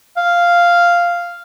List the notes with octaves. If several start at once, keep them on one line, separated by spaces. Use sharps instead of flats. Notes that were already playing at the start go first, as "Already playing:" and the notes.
F5